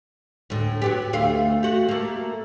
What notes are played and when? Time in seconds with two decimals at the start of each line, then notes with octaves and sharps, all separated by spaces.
0.50 D2 A2
0.82 F#3 B3 G4
1.13 D2 A3 F5
1.63 F#4 G4
1.88 A3 A#3